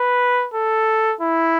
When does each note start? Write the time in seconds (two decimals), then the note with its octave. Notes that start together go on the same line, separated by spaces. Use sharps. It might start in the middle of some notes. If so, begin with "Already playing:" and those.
Already playing: B4
0.54 A4
1.21 E4